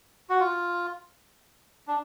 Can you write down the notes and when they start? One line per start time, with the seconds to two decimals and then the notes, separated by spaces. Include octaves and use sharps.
0.30 F#4
0.40 F4
1.88 D4